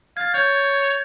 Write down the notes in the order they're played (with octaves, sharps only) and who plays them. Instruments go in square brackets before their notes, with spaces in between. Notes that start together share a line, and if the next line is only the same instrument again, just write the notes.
[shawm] F5 [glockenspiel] G#6 A6
[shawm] C#5 [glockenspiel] G6